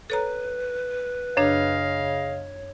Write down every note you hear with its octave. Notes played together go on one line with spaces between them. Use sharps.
A4 B4 C#5 A#5
F#2 C#3 D4 C#5 D#5 F5